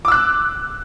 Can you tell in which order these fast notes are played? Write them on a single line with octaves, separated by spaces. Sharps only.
D6 E6 F#6